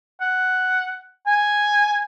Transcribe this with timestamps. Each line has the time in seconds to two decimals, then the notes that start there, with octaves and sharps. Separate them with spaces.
0.21 F#5
1.27 G#5